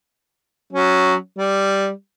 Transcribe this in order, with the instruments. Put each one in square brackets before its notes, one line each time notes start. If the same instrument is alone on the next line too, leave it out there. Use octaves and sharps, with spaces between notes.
[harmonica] F#3 C#4
G3